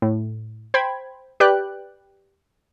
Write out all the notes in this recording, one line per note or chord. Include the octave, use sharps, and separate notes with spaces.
A2
C5 G5 B5 G#6
G4 B4 D5 G5 F#6